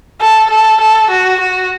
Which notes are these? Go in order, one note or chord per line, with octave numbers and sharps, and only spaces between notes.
A4
A4
A4
F#4
F#4